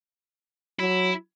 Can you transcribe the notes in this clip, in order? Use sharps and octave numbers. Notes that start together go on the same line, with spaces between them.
F#3 E4